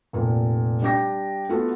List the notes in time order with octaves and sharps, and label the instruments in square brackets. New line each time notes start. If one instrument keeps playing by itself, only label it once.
[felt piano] F1 A#2
G3 D4 D5 G5 D6 A#6
A3 B3 F4 F#4